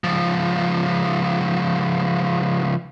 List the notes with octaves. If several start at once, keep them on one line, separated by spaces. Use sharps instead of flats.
C#2 F3